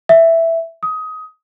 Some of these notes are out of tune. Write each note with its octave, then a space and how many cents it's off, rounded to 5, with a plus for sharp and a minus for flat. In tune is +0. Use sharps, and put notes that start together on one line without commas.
E5 +0
D#6 +20